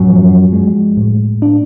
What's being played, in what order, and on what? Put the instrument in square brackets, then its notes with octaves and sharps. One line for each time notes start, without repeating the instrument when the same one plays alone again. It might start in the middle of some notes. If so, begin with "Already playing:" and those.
Already playing: [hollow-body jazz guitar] F#2 F#3 [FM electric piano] A2
[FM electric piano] F3
G#3
A2
D4